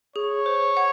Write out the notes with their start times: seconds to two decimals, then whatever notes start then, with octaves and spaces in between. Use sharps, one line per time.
0.16 G#4 C#5
0.46 C5
0.77 F#5